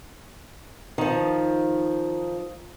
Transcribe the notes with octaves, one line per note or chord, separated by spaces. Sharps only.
D#3 F3